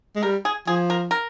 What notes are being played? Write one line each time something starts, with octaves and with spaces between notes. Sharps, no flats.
G#3
G3 A#4
G#4
F3 G#4
A#4
A#4